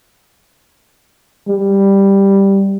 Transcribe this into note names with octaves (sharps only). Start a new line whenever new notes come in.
G3